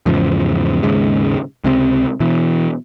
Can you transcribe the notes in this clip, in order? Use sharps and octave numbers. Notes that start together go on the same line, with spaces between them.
E2 G#2 C#3 F3
D#2 G#2 C#3 G#3
C#2 C3 D#3 C4
B2 E3